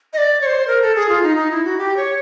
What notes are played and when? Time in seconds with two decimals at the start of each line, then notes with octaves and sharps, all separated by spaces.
0.13 D#5
0.18 D5
0.41 C#5
0.46 C5
0.68 A#4
0.82 A4
0.95 G#4
1.09 F4
1.23 D#4
1.37 D#4
1.51 E4
1.64 F#4
1.78 G4
1.97 C#5